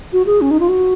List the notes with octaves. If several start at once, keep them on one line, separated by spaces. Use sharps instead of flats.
F#4
G#4
C#4
D#4
F4
F#4